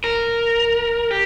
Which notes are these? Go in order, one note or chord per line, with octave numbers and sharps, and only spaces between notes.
A#4
G4